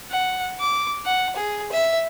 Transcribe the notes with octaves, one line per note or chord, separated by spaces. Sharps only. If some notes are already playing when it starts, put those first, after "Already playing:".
F#5
D6
F#5
G#4
E5